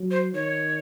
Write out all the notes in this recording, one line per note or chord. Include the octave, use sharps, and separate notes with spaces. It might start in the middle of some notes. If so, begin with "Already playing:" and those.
Already playing: F#3
C5
D#3 C#5